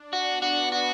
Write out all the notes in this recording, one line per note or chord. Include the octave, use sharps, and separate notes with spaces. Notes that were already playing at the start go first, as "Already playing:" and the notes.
Already playing: D4
F#4
B3
F#4
F#4